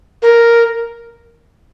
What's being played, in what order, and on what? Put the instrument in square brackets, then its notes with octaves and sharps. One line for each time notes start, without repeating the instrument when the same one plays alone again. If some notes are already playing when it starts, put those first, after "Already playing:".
[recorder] A#4